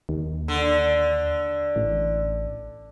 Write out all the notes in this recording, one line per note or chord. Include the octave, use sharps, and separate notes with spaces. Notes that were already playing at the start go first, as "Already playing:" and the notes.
D#2
D3
A1